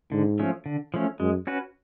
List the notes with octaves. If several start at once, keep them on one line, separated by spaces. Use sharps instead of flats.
G#2 D3
F3 A3 C#4
D3
F3 A3 C#4
F#2 G#3
C#4 F#4 B4